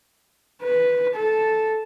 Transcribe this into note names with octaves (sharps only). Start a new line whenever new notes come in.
B4
A4